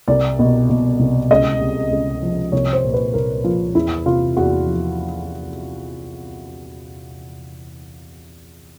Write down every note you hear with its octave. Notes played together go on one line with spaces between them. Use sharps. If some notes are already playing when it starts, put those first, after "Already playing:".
C2 D5
B2
B2
C2
C#2 D#5
C3
C#2
F3
C2 C#5
C5
A#2
B4
C2 A#4
F3 F4
E2 E4
C3 F4
E2 F#4
F3